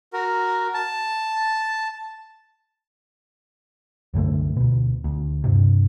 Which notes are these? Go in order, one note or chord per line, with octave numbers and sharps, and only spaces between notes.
F#4 A#4
A5
C2 F#2 D3 A3
D2 B2
D2
G2 C3